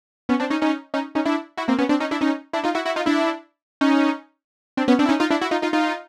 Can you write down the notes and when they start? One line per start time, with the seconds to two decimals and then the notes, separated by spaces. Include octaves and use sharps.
0.29 B3 C#4
0.40 C4 D4
0.50 C#4 D#4
0.62 C#4 D#4
0.94 C#4 D#4
1.15 C#4 D#4
1.25 D4 E4
1.57 E4 F#4
1.68 A#3 C4
1.79 B3 C#4
1.89 C4 D4
2.00 C#4 D#4
2.11 D4 E4
2.21 C#4 D#4
2.53 D4 E4
2.64 D#4 F4
2.75 E4 F#4
2.85 E4 F#4
2.96 D#4 F4
3.06 D4 E4
3.81 C#4 D#4
4.77 C4 D4
4.88 B3 C#4
4.99 C4 D4
5.05 E4
5.09 C#4 D#4
5.20 D#4 F4
5.31 D4 E4
5.41 E4 F#4
5.51 D#4 F4
5.62 D#4 F4
5.73 D#4 F4